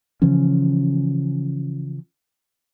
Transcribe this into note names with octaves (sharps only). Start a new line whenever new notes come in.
C#3 E3 F3 C#4